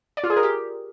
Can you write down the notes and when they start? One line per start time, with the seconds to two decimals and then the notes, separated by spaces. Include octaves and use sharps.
0.17 D5
0.24 F4
0.30 G#4
0.36 A#4
0.43 G4